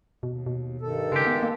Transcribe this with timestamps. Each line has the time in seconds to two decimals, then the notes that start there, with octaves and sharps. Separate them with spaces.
0.23 D#2 B2
0.46 B2
0.81 G2 D#3 A4
1.12 C#3 G#3 G4
1.27 B3
1.43 A#3